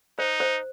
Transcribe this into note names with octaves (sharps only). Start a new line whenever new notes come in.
D#4 C5
C5